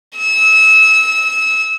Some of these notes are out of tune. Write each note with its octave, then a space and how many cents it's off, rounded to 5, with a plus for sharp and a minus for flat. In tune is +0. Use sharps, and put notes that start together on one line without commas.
E6 -25